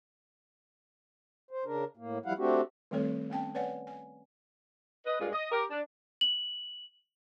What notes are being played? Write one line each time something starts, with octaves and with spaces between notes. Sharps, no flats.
C5
C#3 D4 A#4
A2 A#3
F3 G3 E4 F5 F#5
A3 C4 D4 F#4 G4
D#3 G3 A3 C4 A4 C#5
B3 C#4 G5 A5
B4 C#5 D5 F#5 G#5
G#5
B4 D#5
G2 A#2 G#3 F4
D#5
G4 A#4
D4
F#7